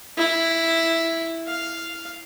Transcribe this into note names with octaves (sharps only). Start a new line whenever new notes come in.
E4
F5